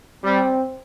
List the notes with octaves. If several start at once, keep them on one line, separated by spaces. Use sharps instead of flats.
G3 C4